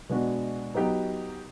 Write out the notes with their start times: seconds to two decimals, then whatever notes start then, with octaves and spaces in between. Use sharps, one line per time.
0.09 B2 G#3 B3 D4 F#4
0.74 F#3 B3 D#4 G4